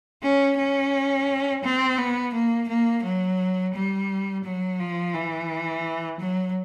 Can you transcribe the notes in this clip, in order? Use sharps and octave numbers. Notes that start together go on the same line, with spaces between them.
C#4
C#4
C4
B3
A#3
A#3
F#3
G3
F#3
F3
E3
F#3